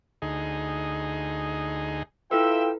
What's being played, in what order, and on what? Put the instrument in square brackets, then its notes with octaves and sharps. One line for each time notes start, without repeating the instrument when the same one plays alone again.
[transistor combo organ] D2 D#4 G#4
[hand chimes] E4 A4 B4 [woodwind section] F4 G5 E6 [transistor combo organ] E5